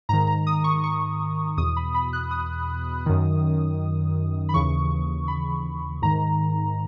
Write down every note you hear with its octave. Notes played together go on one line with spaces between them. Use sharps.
G#2 D#3 A#5
A#5
D#6
C#6
C#6
E2 B2 D#6
B5
B5
F#6
D#6
F#2 D#3
B5
D#2 C#3 E3 C#6
B5
G#2 D#3 A#5